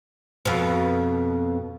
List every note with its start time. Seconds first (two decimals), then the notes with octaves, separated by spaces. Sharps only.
0.45 F2 B2